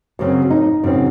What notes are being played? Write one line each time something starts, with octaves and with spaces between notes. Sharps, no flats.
F#2 C#3 F#3 C4
D#4
F#2 C#3 F#3 C4